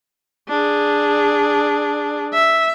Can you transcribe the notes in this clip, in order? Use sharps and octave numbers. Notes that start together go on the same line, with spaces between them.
D4 G#4
E5